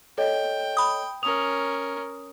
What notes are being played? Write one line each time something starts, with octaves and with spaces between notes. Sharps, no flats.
A4 C#5 D#5 G5
B5 D#6
C#4 A#4 D#6 F7